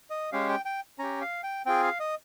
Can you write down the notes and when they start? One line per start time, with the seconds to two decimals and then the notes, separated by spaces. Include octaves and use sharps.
0.10 D#5
0.32 G#3 C#4 G4 F5
0.49 G5
0.65 G5
0.99 C#4 G4 A#5
1.21 F5
1.43 G5
1.66 C4 F4 G#4 G5
1.83 F5
2.00 D#5